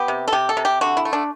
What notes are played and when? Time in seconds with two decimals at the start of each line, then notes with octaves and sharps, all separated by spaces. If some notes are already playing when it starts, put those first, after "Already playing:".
Already playing: B3 G4
0.08 C3
0.28 A4
0.33 C3 G4
0.49 A4
0.57 C3
0.65 G4
0.81 D3 F#4
0.97 E4
1.05 A3
1.13 D4